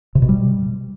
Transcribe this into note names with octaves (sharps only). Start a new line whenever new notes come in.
C3
B2
G3